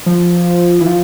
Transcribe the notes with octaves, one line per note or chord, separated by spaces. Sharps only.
F3
E3
F3